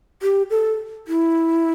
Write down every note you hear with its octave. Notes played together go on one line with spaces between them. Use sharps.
G4
A4
E4